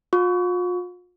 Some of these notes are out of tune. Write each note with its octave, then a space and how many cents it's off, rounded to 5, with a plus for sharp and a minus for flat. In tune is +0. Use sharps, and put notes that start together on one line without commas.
F4 +40 C#6 +25